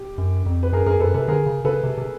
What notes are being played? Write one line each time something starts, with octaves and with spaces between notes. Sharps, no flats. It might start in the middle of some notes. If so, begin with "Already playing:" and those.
Already playing: G4
F#2
F2
B4
F#2 G#4 A#4
F#2 G#4 A#4
F#2 A4 B4
C3 A4 B4
D3 G#4 A#4
C#3
C#3 A4 B4
C3
C3